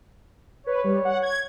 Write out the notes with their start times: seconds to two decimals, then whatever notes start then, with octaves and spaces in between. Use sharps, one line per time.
0.67 B4 C#5
0.84 G3
1.05 F#5
1.22 G#6